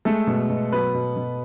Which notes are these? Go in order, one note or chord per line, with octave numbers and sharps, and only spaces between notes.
G#3 A3 A4
B2
B2
F#3 B3 B4
B2
B2